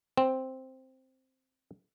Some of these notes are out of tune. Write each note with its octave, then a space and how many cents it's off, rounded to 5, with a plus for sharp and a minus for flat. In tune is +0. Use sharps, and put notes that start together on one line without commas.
C4 +0